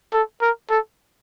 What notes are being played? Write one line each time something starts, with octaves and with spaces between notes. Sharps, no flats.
A4
A#4
A4